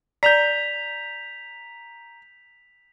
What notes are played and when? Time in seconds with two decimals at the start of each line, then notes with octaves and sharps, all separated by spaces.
0.23 D5 A#5 G6 B6 F7